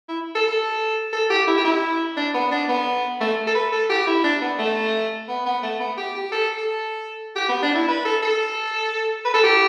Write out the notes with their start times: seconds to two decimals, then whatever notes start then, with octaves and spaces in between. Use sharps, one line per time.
0.09 E4
0.35 A4
0.48 A4
1.13 A4
1.30 G4
1.47 E4
1.57 G4
1.65 E4
2.17 D4
2.34 B3
2.51 D4
2.69 B3
3.21 A3
3.47 A4
3.55 B4
3.72 A4
3.90 G4
4.07 E4
4.24 D4
4.41 B3
4.59 A3
5.28 B3
5.45 B3
5.63 A3
5.80 B3
5.97 G4
6.15 G4
6.32 A4
6.58 A4
7.36 G4
7.49 B3
7.62 D4
7.75 E4
7.88 B4
8.05 A4
8.22 A4
9.25 B4
9.34 A4
9.43 G4